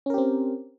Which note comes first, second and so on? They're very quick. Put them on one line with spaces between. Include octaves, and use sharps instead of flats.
C#4 A#4 G4 C4